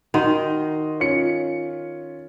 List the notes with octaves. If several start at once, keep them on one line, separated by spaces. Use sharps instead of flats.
D#3 F#4 D#5 C6
C#4 F4 C#7